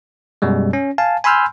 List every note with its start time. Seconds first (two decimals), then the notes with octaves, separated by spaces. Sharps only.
0.42 F#2 B2 G3 G#3
0.73 C#4
0.98 F5 G#5 A5
1.24 G#5 B5 C6 E6 F6 G6